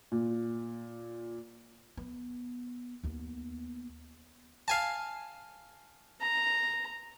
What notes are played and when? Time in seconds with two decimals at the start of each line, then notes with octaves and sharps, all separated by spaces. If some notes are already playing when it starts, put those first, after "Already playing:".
0.12 A#2
1.97 B3
3.03 D#2 B3
4.68 F5 G#5 A5
6.20 A#5